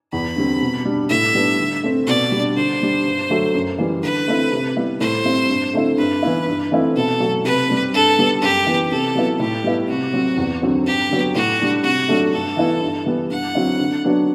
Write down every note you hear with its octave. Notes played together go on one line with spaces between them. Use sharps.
E2 B5
D3 G3 C4
B2
G3 D4
A2 E5
G3 B3 D4
D3
A3 C4
B2 D5
G3 D4
D3 C5
G3 D4
G2
D3 F#3 A3
F#2
E3 G3
D3 B4
A3 C4 E4
C3
G3 B3 E4
A2 C5
G3 C4 E4
G2
D3 A3 C4 E4
G2 B4
E3 B3 E4
G2
E3 A3 C4 E4
B2 A4
F#3 A3
C3 B4
G3 C4
G2 A4
D3 G3 B3
F#2 G4
E3 B3
C3 A4
F#3 B3 E4
A2 G4
G3 B3 E4
C3 F#4
F#3 C4
E2
D3 F#3 C4
G2 G4
D3 F#3 B3
A2 F#4
G3 D4
C3 F#4
F#3 A3 D4
G2 A4
E3 B3 E4
G2
E3 G3 B3
G2 F#5
D3 F#3 C4 E4
D3
F#3 B3 D4